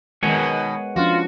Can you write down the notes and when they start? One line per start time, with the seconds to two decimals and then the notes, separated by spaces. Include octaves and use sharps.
0.23 B2 D#3 G#3 B3 A#4 C#5 F#5 G#5
0.96 F3 C#4 D4 F4 F#4